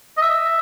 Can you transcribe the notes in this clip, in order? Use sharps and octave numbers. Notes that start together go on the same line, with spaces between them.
D#5
E5